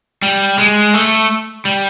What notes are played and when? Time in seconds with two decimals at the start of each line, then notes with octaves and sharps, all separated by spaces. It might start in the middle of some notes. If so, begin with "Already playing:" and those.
0.22 G3
0.58 G#3
0.94 A3
1.65 G3